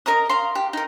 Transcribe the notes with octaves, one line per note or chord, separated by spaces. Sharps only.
A#4 D#5 A#5 D#6
F5 A#5 C6
G4
D#4 A#4